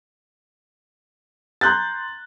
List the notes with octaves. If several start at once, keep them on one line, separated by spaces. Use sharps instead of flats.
A#5 C6 F#6 G6 A6